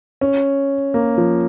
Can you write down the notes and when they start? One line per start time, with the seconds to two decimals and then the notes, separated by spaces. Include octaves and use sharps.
0.21 C#4
0.94 A#3
1.18 F3